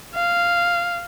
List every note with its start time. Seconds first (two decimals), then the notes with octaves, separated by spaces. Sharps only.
0.15 F5